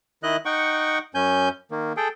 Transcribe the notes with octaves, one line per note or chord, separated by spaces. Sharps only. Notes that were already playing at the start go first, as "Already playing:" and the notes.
D#3 E4 D#5 F#6
D#4 F#5 G5 C#6
F#2 C#4 G#5 G6
D#3 A#3
G#4 A4 G5